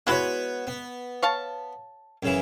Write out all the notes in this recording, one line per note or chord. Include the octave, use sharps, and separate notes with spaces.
G#3 B3 E4 F#4 B4 C#5
B3
C#5 F5 A5
F#2 C#3 E3